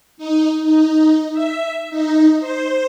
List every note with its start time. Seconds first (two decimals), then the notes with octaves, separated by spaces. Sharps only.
0.18 D#4
0.65 D#4
1.33 E5
1.90 D#4
2.40 C5